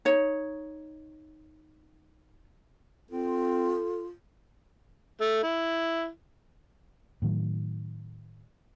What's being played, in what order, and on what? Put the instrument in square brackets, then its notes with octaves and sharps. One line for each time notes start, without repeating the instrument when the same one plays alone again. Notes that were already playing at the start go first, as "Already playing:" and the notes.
[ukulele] D#4 C#5
[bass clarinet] C4 [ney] F4 [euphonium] A4
[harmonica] A3
E4
[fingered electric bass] A2 D#3 F#3